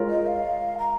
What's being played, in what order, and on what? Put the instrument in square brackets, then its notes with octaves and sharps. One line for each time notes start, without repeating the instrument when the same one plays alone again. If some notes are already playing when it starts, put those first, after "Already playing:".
Already playing: [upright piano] G#3 F4 A#4 C#5
[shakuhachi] D#5
F5
A#5